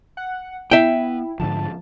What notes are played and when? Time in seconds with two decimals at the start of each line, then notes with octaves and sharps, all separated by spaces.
0.17 F#5
0.71 B3 E4 E5 G5
1.40 G#2 D3 F3 A5